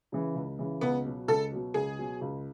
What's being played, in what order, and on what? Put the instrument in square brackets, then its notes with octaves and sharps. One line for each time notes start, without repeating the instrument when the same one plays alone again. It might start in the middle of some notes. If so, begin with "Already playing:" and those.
[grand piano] C#3 E3
C#2
C#3 E3
[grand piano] C#2 [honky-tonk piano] B3
[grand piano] B2 F#3
[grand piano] C#2 [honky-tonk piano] A4
[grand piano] B2 F#3
[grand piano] C#2 [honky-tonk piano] G#4
[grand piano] B2 F#3
C#2